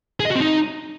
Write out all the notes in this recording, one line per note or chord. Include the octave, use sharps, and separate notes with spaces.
G#4
D#5
F#4
C4
D#4